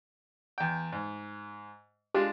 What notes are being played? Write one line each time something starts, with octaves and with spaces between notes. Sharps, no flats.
E2 G5
G#2
G#3 D4 F4 G4